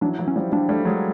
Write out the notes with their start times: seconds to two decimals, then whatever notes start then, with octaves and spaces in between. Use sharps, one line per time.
0.01 E3 F#3 D4
0.19 E3 F#3
0.28 C#4
0.36 F3 G3
0.52 F3 G3 D4
0.69 G3 A3
0.85 F#3 G#3